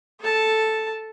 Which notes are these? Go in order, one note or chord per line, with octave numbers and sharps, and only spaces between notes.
A4 A5